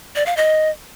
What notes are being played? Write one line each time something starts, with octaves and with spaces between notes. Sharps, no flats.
D5
F5
D#5